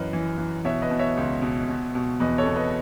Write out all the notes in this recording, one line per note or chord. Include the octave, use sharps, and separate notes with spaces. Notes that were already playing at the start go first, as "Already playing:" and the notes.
Already playing: F#2 E3 B4 D#5
E3
E3
B2 C#5 E5
B4 D#5
B2
C#5 E5
C#2
B2
B2
B2
E2 B4 D#5
A4 C#5
B2
B4 D#5